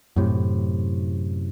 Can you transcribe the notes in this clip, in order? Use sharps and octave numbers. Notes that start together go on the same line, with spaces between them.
F#2 A2 C3